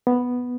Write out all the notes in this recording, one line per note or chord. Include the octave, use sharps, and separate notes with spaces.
B3